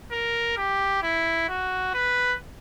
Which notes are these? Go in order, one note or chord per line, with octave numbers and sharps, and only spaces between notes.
A#4
G4
E4
F#4
B4